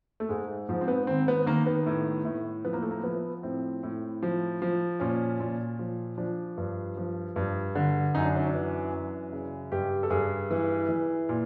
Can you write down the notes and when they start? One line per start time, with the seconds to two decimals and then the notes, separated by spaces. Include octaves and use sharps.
0.20 A3
0.29 G#2 G#3
0.68 G#2 F3
0.81 C4
0.88 B3
1.07 D#3 C4
1.28 B3
1.47 D#3 A#3
1.66 B3
1.86 A2
2.25 A2
2.65 F3 B3
2.73 A#3
2.82 A3
2.91 A#3
3.04 F3 B3
3.43 A2 C4
3.83 A2
4.22 F3
4.62 F3
5.00 A#2 C#4
5.40 A#2
5.79 F3
6.18 F3 D4
6.58 G2
6.97 F3
7.36 G2
7.75 D3
8.14 F#2 D#4
8.25 D4
8.36 C#4
8.46 D4
8.54 E3
8.93 F#2
9.32 C#3
9.72 G2 G4
10.03 A4
10.10 G2 G#4
10.51 E3
10.89 E3
11.29 A#2